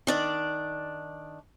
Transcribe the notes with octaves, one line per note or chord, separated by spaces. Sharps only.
D#3 D4 D5